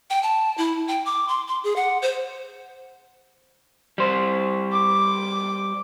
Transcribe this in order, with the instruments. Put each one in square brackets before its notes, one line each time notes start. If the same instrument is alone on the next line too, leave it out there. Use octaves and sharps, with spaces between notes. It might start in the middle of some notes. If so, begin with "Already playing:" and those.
[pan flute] G5
A5
E4
G5
D6
C6
C6
G#4
F#5
C5
[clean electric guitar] G3 C5
[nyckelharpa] D6